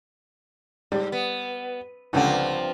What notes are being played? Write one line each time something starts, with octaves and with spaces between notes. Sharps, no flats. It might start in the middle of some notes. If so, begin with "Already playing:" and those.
G#2 G3
B3
C#2 G2 D3 F3 C4